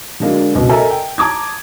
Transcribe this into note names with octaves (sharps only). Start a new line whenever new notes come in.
D3 F#3 G#3 A#3 D4
C#2 B2
A4 A#4 D#5 E5 G#5 A#5
G5
A5 A#5 D6 D#6 G#6